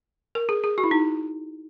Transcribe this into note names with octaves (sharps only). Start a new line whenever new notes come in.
A#4
G#4
G#4
F#4
E4
D#4